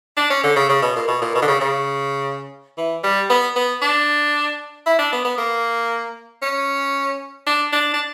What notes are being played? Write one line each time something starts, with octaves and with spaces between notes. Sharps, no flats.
D4
C#4
D3
C#3
C#3
B2
A#2
B2
A#2
B2
D3
C#3
C#3
E3
G3
B3
B3
D4
E4
D4
B3
B3
A#3
C#4
D4
D4
D4